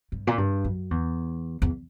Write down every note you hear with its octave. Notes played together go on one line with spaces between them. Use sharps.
G2
A#2
G2
F#2
E2
E2